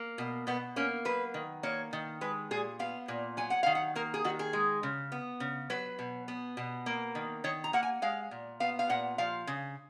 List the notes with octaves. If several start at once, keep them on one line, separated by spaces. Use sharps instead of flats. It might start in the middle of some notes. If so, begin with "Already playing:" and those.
Already playing: A#3
B2
B2 B3
A#3 C#4
F#3 B4
D#3
A#3 C#5
D#3
G#3 B4
A#2 G#4
B3 F5
A#2
F#3 G#5
F#5
D#3 F5
F#5
A#3 A#4
G#4
D#3 F#4
G#4
G#3
C#3
B3
C#3
F#3 B4
B2
B3
B2
A#3
D#3
D#3 C#5
A#5
A#3 F#5
G#5
G#3 F5
A#2
B3 F5
F5
A#2 F#5
F3 F5
C#3